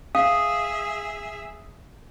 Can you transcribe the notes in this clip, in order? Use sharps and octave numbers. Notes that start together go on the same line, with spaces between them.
G#4 E5 F5 D#6